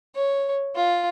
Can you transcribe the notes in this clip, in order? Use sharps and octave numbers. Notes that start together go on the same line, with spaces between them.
C#5
F4